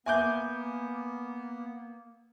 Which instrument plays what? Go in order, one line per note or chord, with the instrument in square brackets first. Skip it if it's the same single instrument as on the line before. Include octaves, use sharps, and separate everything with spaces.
[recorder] A#3 [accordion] B3 [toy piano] E5 C6 [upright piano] G#5 D6 G6